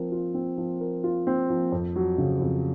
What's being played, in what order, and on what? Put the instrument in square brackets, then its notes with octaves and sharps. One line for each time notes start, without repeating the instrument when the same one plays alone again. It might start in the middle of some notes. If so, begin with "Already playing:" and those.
Already playing: [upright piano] F3 C4 A#4
F4
C4
F3
A#4
F4
C4
F3
F2
F#3
C#3
F2